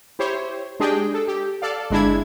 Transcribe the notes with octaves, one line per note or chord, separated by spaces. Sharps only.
E4 G4 C5 C#5
G#3 D4 G4 G#4 D#5 G5
A4
G4
A4 D5 F5
G1 G#3 D4 E4 G#6